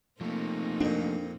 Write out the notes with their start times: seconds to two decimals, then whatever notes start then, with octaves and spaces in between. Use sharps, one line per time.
0.21 F3 A3 A#3 C4 D#4
0.81 F2 A#2 D4